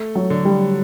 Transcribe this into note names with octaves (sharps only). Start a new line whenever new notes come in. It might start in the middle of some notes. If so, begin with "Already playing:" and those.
Already playing: A3
F#3
D3
G3